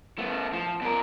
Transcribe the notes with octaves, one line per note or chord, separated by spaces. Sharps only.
A3 B3
F3
B2 A#4